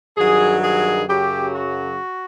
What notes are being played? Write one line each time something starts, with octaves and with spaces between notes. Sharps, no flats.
G2 D#3 F#3 G#4
G#4
F#2 C#3 F#3 G4
F#4